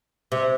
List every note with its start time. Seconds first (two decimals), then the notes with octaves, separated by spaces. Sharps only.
0.32 C3